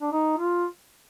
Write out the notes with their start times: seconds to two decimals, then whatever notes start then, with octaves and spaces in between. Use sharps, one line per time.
0.01 D4
0.12 D#4
0.38 F4